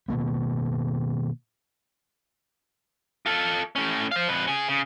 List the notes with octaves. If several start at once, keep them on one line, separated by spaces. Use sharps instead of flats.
B2 D#3 A#3 B3
F4 A4
A2 C#4
C5 F5
F2 B4
C#4 G#4
C#3